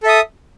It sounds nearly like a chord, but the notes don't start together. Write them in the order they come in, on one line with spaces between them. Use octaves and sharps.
A4 E5 D#6